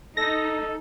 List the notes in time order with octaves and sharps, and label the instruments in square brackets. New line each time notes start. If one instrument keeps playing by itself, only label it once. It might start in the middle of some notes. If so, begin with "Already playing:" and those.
[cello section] D#4 [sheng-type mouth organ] A4 [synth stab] A#6